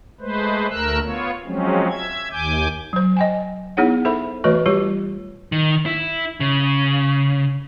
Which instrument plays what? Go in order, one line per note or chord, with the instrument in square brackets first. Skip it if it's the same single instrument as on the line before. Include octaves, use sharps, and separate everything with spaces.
[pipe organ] G#3 A3 B4 C5
D2 A3 A#4 E6 F#6
B3 F4 C#5
F3 F#3 G#3 C4 C#4
E5 G#6
D#2 G#5 D6 G6
[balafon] F#3 C5
D#5 G5 G#5
B3 D#4 E4 G#4 C#5 F#5
A4 C5 E5 B5
E3 A3 F#4 B4 C#5 D#5
G3 F4 G4 C#5
[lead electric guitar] D#3
E4
C#3